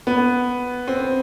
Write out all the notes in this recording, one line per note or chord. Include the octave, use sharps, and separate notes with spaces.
B3
C4